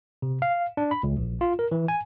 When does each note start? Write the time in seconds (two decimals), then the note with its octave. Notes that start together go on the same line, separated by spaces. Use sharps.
0.22 C3
0.42 F5
0.77 D4
0.91 B5
1.03 C#2
1.17 A#1
1.41 F4
1.59 A#4
1.72 E3
1.88 G#5